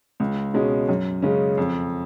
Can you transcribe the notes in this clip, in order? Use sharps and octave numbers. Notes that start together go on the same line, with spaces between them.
C#2
B2 G#3 C#4
F#2
C#3 G#3 C#4
F2